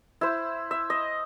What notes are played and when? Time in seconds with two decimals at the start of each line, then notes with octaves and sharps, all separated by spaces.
0.21 E4 C5
0.71 E5
0.90 D#5